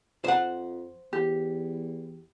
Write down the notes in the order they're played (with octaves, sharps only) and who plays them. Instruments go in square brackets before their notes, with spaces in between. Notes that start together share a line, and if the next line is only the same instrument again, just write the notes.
[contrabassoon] F2 [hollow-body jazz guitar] C5 F#5
[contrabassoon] E2 [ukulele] G4